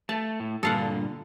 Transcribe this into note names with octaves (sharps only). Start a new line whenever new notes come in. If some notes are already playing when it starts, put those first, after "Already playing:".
A3 A5
A2
G2 A#2 D3 A4 F5 F#5